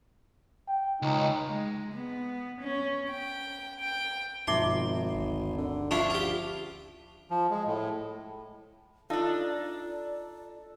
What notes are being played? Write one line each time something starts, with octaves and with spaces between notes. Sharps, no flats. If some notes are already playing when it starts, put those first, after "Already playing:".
G5
C#2 D#4
G#3
B3
C#4
G5
G5
G#1 G2 B2 F3 D#4 E5 C6 D6
G1 D2
D3
F3 C#4 D4 E4 F4 C#6
F4 G4
F3
G#3
A2
D4 D#4 F4 A4 D5